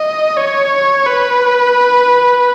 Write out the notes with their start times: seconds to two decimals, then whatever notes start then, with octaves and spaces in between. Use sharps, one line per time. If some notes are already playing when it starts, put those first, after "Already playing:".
Already playing: D#5
0.37 C#5
1.07 B4